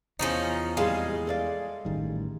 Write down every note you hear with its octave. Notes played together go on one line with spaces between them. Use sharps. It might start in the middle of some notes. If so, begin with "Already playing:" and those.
E2 F3 C#4 D#4
F2 G3 G#3 F5
A4 D5 F5
A1 D#3 G3